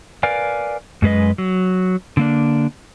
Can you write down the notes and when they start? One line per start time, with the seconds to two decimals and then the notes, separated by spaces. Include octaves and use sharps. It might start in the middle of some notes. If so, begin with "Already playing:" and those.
0.23 A#4 B4 D5 F5 G#5
1.02 F#2 G#3 B4 D#5
1.38 F#3
2.17 D3 A#3 D4